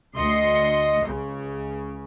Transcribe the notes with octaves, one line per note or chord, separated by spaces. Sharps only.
D2 D#5 C6 C#7
C#2 C#3